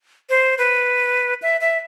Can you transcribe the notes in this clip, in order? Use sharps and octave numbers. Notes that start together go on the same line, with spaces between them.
C5
B4
E5
E5